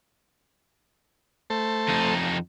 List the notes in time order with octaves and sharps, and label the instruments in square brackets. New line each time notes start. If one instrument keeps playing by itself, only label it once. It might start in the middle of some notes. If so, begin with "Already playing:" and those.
[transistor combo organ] A3 A4 C5
[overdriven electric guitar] F2 D#4